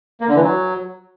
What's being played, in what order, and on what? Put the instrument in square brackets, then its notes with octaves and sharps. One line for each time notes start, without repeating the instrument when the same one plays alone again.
[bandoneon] A#3
D3
E3
F#3